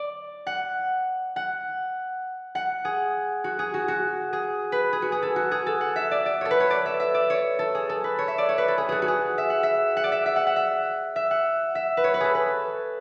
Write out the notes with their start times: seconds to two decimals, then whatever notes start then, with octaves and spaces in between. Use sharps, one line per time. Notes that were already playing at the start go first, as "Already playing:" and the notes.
Already playing: D5
0.47 F#5
1.36 F#5
2.55 F#5
2.85 G#4
3.44 F#4
3.59 G#4
3.74 F#4
3.88 F#4
4.33 G#4
4.72 B4
4.93 G#4
5.02 F#4
5.12 G#4
5.22 A4
5.36 F#4
5.51 G#4
5.66 A4
5.81 F#5
5.96 E5
6.11 D5
6.26 D5
6.41 A4 C#5
6.51 B4
6.60 C#5
6.70 D5
6.86 E5
7.00 E5
7.14 D5
7.30 C#5
7.59 A4
7.75 G#4
7.89 A4
8.04 B4
8.19 C#5
8.28 E5
8.38 D5
8.49 C#5
8.58 B4
8.68 A4
8.78 G#4
8.89 F#4 G#4
9.02 F#4
9.08 G#4
9.38 E5
9.50 F#5
9.63 E5
9.97 F#5
10.04 D5
10.12 E5
10.26 E5
10.36 F#5
10.47 F#5
10.56 E5
11.16 E5
11.31 F#5
11.75 E5
11.97 B4
12.04 C#5
12.14 B4
12.20 G#4 A4
12.35 B4